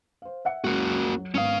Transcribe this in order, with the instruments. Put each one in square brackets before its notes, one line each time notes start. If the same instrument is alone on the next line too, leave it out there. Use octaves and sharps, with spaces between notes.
[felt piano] C5 F5
E5 F#5 C#7
[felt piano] C#2 F#2 [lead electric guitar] A#3 F#4
[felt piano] F#3
[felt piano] G#1 B3 D#6 [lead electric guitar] C#4 F5